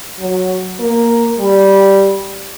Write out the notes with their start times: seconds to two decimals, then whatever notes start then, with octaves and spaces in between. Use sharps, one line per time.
0.20 F#3
0.79 A#3
1.38 G3